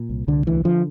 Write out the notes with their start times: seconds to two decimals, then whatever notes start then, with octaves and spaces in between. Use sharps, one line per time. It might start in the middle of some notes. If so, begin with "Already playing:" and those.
Already playing: A#2
0.09 C2
0.27 C2 D3
0.47 D2 E3
0.65 D3 F3